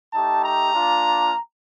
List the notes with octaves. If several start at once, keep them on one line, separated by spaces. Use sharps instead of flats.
A3 D#4 G4 A5
A#5
A#3 D4 F4